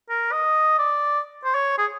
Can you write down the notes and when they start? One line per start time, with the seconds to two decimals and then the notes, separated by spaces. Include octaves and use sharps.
0.10 A#4
0.32 D#5
0.78 D5
1.44 C5
1.55 C#5
1.78 G#4